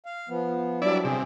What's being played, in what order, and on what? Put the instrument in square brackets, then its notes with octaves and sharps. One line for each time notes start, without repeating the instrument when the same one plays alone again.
[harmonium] F5
F3 B3
[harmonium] F#3 G3 D4 [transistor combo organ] E4 D5
[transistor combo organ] C3 [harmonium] G#4